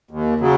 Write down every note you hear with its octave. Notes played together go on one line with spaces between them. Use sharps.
D#2
C#3 F#3